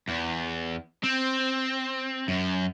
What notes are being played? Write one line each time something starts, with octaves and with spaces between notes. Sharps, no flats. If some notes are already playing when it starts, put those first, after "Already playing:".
E2
C4
F#2